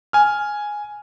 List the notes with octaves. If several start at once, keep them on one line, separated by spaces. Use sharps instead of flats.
G#5 F6